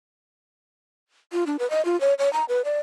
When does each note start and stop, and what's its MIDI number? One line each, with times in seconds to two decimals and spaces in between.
1.33 1.44 65
1.47 1.57 62
1.59 1.69 71
1.70 1.84 75
1.85 1.99 65
2.01 2.14 73
2.19 2.31 73
2.33 2.45 82
2.49 2.62 71
2.65 2.79 74